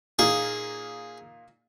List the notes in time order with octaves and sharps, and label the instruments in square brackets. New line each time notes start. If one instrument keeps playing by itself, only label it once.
[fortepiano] A#2 A#3 D#4 [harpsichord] G#4